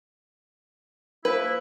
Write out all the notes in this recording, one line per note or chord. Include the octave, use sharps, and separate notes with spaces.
F3 A#3 E4 B4